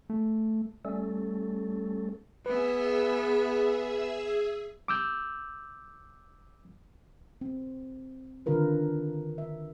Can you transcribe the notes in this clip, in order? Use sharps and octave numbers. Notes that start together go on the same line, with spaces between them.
A3
G3 A3 C#4 A4
B3 G#4 B4 E5 E6
D6 E6 G6
C4
D3 D#3 D4 F4 A#4 B4
E5